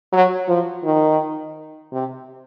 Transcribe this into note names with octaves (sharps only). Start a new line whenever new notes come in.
F#3
F3
D#3
C3